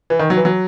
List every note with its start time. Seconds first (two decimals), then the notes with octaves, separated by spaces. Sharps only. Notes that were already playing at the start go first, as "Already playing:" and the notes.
0.10 E3
0.19 D#3
0.30 F#3
0.37 E3
0.45 F#3